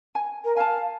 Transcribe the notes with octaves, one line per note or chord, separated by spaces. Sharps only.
G#5
A#4
F5 G#5 A5